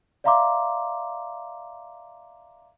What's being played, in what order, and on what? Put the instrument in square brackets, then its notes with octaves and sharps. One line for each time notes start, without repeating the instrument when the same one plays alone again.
[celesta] D5 E5 F5 A#5 C6 D6